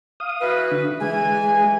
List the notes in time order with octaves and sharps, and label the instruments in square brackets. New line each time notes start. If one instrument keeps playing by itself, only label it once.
[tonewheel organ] F5 D#6
[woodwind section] E3 F#4 B4
[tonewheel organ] D3
[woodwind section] E3 G#5 [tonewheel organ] G#3